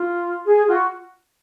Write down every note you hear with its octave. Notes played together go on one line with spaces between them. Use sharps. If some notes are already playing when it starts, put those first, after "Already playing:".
Already playing: F4
G#4
F4 F#4